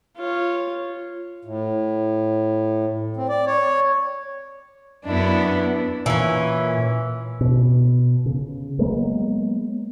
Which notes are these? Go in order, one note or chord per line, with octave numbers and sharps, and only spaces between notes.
F4 C#5
A2
C4
D5
C#5
F#2 B3 D4 E4
A#2 E3 C#4
B2
C#3
F#3 G#3 A#3 B3